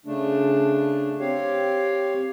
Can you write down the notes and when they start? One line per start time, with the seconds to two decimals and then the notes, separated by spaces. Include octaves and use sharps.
0.06 C#3 A3 D4
1.20 C4 G4 C#5 F5